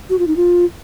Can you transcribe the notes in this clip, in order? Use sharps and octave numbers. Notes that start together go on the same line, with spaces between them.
F#4
F4
D#4
F4